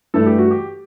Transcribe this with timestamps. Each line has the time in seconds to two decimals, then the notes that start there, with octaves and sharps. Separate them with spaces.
0.14 G2 E3 A3 A4
0.26 G4
0.38 F#4
0.51 G4